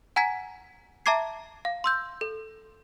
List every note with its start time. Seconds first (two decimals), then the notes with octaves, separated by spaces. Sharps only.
0.16 F#5 G#5 A#5 G#6 B6
1.06 E5 A5 A#5 D6 G#6 C7
1.65 F5
1.84 C6 E6 G6
2.21 A4